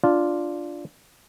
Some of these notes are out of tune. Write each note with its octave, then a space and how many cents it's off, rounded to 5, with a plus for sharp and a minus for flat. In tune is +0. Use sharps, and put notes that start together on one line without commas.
D4 +0 F4 +0